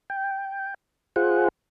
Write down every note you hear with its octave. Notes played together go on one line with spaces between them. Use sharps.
G5
F4 G#4 C5 F#5